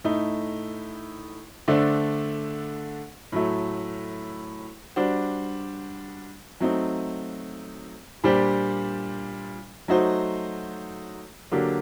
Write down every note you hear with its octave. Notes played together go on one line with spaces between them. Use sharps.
A2 A3 D#4
D3 A3 D4 A4 C5
A2 F#3 A3
G3 D4 F#4 C5
F#3 A3 C4 D#4
A#2 G3 D4 G4 C5
F#3 A3 D#4 F#4 C5
D3 F#3 A#3 D4 G4